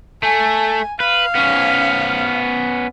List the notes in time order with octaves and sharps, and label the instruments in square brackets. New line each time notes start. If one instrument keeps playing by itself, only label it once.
[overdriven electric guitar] A3 [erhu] G#5
[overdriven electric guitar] B4 [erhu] F5
[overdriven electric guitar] B3 C#4